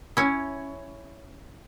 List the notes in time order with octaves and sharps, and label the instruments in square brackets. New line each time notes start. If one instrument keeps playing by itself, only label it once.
[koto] C#4 E4